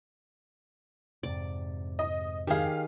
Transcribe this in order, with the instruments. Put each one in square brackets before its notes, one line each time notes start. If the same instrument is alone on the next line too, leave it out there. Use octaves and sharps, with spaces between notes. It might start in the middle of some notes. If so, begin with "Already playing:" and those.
[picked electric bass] F2 G#2 C3 [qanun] D5
[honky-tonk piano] D#5
[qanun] D#3 G#4 [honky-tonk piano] G4 F5